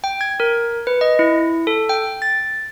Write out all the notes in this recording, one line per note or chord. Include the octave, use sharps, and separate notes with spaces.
G5
G#6
A#4
B4
D#5
E4
A4
G5
A6